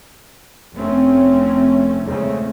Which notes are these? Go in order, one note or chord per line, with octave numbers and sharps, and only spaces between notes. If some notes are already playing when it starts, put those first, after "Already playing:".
F1 A3 C4 C#4
E2 C#3 G#3 A3 C4